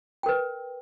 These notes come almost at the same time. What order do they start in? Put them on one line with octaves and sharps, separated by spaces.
G5 A#4 B4